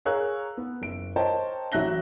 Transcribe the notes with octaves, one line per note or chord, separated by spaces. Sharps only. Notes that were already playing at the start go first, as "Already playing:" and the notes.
G#4 A#4 C#5 F5 E6 F#6
B3
F#1 D7
A#4 C5 C#5 D#5 G5 A5
A1 F#3 E5 F#6 A#6 G7